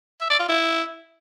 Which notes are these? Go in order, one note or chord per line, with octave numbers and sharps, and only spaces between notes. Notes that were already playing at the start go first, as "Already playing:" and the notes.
E5
D5
F4
E4